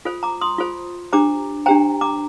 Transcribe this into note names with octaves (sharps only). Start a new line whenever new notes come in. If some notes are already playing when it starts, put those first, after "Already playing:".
F4 A4 C5
A#5 D6
C6 D#6
F4 A4 C5
D4 G4 C5 A#5 D6
D4 G4 C5 G5 A#5
A#5 D6